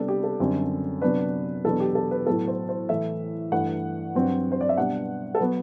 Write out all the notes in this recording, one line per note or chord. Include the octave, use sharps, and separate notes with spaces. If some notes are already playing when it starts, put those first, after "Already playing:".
Already playing: C3 G3 B3 D4 A4
G4
A4
F#2 D3 G3 C4
C3 F#3 B3 D4 B4
E2 B2 F#3 B3 D4 A4
G4
A4
B4
A2 F#3 B3 A4
C5
C5
A2 E3 A3 E5
G2 E3 A3 E4 F#5
G2 F#3 C4
C5
D5
E5
B2 G3 D4 F#5
A4
F#3 B3 B4